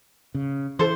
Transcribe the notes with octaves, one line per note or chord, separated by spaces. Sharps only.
C#3
E3 A4 C5